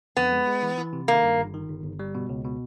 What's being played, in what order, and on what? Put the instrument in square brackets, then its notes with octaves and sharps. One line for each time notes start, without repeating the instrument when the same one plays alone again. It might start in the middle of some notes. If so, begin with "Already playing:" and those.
[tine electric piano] F2 [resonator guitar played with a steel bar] B3
[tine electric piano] G#3
G#3
E3
E3
C3
[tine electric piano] D#3 [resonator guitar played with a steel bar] A#3
[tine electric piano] G2
G1
D#3
G1
G1
G3
B2
C#2
B2